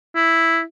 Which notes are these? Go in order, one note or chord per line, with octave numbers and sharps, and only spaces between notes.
E4